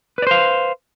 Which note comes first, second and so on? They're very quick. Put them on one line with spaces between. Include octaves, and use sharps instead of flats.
B4 D5 C5 F5